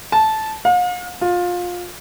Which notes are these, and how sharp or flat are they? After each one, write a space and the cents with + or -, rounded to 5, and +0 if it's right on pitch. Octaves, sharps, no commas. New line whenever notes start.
A5 -10
F5 +45
F4 +20